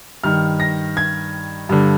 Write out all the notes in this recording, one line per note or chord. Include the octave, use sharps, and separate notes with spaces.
G2 D#3 F6
A#6
G#6
G2 D3